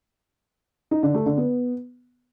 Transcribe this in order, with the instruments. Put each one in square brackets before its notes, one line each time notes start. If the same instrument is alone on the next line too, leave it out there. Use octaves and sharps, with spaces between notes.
[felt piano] D#4
D3
A3
D3
B3